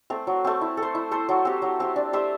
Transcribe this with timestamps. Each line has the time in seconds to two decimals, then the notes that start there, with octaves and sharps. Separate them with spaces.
0.10 A3 C4
0.27 F#3
0.45 A3 C4
0.61 E4
0.77 A4
0.82 C5
0.95 E4
1.11 A4 C5
1.29 F#3
1.45 C4 G4
1.62 F#3
1.80 C4 G4
1.96 D4
2.13 G4 C5 E5